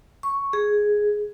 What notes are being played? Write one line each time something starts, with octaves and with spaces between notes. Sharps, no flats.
C#6
G#4